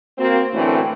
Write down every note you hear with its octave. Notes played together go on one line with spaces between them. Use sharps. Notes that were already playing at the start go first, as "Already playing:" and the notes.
A#3 C4 F#4
F#2 A2 D3 E3 A3 C4